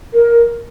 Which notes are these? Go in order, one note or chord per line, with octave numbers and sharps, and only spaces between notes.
A#4